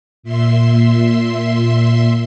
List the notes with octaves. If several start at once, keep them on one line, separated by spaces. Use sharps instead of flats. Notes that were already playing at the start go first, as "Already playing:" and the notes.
A#2 E5 C6